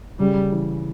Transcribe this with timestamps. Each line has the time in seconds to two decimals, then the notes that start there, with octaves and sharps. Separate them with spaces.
0.20 C#3 G3
0.52 E3